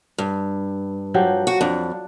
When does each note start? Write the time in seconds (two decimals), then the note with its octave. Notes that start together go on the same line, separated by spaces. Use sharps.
0.18 G2
1.14 F3 F#3 G4
1.47 F#4
1.61 F2 D4